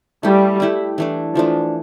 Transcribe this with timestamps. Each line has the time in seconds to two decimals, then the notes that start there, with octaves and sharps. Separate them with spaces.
0.23 G3 A3 E4 G4
0.60 A3 E4 G4
0.98 E3 A3 D4
1.35 E3 F3 A3 D4